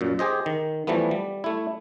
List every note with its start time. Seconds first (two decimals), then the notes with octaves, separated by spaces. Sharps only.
0.01 F#2 A#2
0.19 G4 G#4 C5 D#5
0.46 D#3
0.87 E3 F3 G3 A3 B3
1.11 G3
1.44 A3 E4